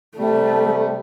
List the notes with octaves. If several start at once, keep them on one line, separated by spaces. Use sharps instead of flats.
C3 G3 A3